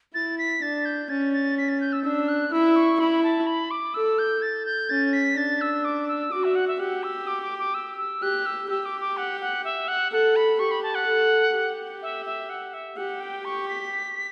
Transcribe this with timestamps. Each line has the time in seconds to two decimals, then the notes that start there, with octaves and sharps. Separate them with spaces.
0.14 E4 A6
0.38 B6
0.62 D4 A6
0.85 G6
1.10 C#4 A6
1.33 A6
1.58 B6
1.69 A6
1.81 G6
1.93 E6
2.04 D4 E6
2.29 F#6
2.52 E4 E6
2.76 C#6
3.00 E4 B5
3.23 A5
3.47 B5
3.71 D6
3.94 A4 E6
4.19 G6
4.42 A6
4.66 G6
4.90 C#4 A6
5.13 B6
5.37 D4 A6
5.61 E6
5.85 D6
6.08 E6
6.32 F#4 D6
6.44 E5
6.55 F#5
6.68 E5
6.80 G4 F#5
7.03 E6
7.27 D6
7.43 D6
7.58 D6
7.74 E6
7.98 E6
8.22 G4 F#6
8.46 E6
8.69 G4 E6
8.85 D6
9.01 D6
9.17 F#5
9.41 F#5
9.64 E5
9.88 F#5
10.12 A4 F#5
10.36 B5
10.59 G4 C#6
10.71 B5
10.83 A5
10.95 F#5
11.07 A4
11.55 G4
12.02 E5
12.26 E5
12.49 F#5
12.74 E5
12.97 G4 F#5
13.20 G5
13.45 C#6
13.68 B6